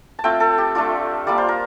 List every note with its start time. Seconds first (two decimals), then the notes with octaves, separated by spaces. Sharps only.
0.19 A5
0.24 A3 C4 F4 G5
0.40 A4
0.58 G4
0.75 A3 D4 F4
1.27 G3 A#3 F4 D5
1.38 C5
1.49 A#4